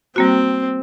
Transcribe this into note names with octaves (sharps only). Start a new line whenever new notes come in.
G3 A#3 C4 F#4